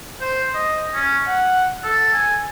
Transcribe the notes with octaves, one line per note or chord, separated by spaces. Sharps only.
C5
D#5
C#4
F#5
A4
G#5